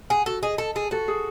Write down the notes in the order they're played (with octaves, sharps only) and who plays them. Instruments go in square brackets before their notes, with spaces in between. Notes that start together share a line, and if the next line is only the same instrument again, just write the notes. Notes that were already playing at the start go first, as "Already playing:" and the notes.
[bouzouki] G#4 [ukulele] F#5
[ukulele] F#4 [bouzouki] A4
[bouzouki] G#4 [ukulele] D#5
[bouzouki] A4 [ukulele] A5
[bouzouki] G#4 [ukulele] A4
[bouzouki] F#4 [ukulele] A4
[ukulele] G#4